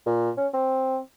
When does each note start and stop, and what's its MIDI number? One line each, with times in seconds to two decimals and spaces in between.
0.06 0.30 46
0.37 0.47 61
0.53 0.98 60